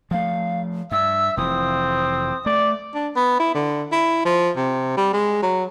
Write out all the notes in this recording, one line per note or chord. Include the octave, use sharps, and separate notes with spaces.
F3 A3 F5
G2 E5 E6
F1 E3 C4 D#6
A3 D5
D4
B3
E4
D3
E4
F3
C3
G3
G#3
F#3